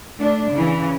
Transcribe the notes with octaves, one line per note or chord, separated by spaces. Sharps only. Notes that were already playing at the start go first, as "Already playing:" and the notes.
A3 D4
C#3 E3